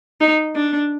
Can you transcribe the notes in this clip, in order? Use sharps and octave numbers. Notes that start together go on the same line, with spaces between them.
D#4
D4